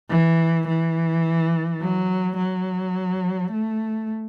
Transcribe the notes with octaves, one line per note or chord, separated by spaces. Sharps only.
E3
E3
F#3
F#3
A3